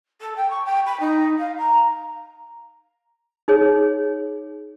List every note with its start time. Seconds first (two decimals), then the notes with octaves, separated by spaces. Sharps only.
0.20 A4
0.36 G5
0.50 C#6
0.64 G5
0.85 B5
1.00 D#4
1.38 F5
1.57 A#5
3.48 D#4 G#4 C#5